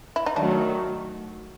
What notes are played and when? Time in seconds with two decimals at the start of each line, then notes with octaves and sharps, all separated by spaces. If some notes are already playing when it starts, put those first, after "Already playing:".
0.16 E4
0.26 D#4
0.36 D#3 F#3 A3 D4